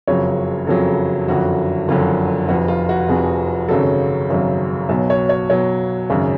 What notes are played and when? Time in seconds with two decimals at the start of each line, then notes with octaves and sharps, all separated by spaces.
0.08 F#1 F2 C#3 F#3 C#5
0.67 F#1 F2 C#3 F#3 A4
1.28 F#1 F2 D3 F#3 F#4
1.88 F#1 F2 D3 F#3 F4
2.49 F1 F2 F3 F#4
2.68 F4
2.89 F#4
3.09 F1 F2 F3 G#4
3.69 G#1 F#2 C#3 F#3 A4
4.30 G#1 F#2 C#3 F#3
4.89 B1 B2 F#3
5.10 C#5
5.29 C#5
5.50 B1 B2 F#3 C#5
6.10 G#1 F#2 C#3 G#4